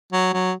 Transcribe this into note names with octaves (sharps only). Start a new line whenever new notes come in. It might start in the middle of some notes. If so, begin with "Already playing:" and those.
F#3
F#3